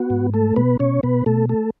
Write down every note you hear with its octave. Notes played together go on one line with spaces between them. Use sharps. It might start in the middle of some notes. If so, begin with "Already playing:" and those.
Already playing: B3 F#4
G#2
A3 A4
B2 B3 B4
B2 C#4 C#5
B2 B3 B4
B2 A3 A4
A3 A4